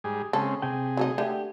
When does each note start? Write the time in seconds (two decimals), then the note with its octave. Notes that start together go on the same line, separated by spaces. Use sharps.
0.04 G#2 G3 G#4
0.33 C#3 G#3 C4 A4
0.62 C3 G#4 G5
0.97 F#3 A3 D#4
1.18 D3 A3 G4